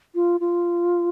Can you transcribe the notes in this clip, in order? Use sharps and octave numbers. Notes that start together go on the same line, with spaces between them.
F4
F4